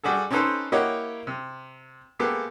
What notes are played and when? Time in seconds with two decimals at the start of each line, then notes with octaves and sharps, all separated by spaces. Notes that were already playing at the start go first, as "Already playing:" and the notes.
0.04 G3 F#4 G#4 A4
0.31 C4 C#4 D#4 A4 B4 C5
0.72 A#3 E4 G4 C#5 D#5 F#5
1.27 C3
2.19 G#3 A#3 B3 G4 A4